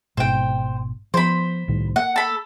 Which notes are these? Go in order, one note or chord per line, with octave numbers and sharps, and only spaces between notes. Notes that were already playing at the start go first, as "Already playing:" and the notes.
G#1 G#2 B2 C5 G5
F3 B3 C5 B5
C2 A2 D#3
A#3 F#5
A4 B5